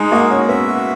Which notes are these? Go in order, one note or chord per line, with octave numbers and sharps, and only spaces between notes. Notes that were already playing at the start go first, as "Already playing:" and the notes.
Already playing: G#3 D#4
A#3 F#4
C#4 F#4
B3 E5
F#4